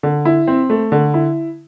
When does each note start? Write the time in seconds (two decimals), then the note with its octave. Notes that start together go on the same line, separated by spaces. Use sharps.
0.03 D3
0.25 E4
0.47 C4
0.70 A3
0.92 D3
1.14 E4